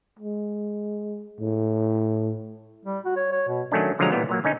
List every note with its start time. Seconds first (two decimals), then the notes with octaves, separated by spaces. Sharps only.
0.19 G#3
1.40 A2
2.85 G3
3.05 F#4
3.16 C#5
3.32 C#5
3.48 B2
3.71 D#3 F#3 A3 C#4 D4
3.99 B2 D3 F3 F#3 G#3 A#5
4.11 A#2 E3 G3 B3 F4
4.29 A#2 F#3 A#3
4.44 D3 C#4 D#4